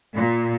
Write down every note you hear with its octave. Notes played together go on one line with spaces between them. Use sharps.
A#2